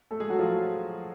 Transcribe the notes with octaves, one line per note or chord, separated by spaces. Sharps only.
A3 A4
G#3 G#4
F#3 F#4
F3 F4